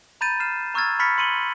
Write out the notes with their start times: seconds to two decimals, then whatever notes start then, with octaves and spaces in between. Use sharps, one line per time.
0.21 A#5 B5 G6 A6 D#7
0.40 F6 C7 E7
0.74 A#5 C#6 E6 F6 G#6 A6
0.99 B5 C#6 F6 A6 B6 C#7
1.18 C6 C#7 D#7 F#7 G7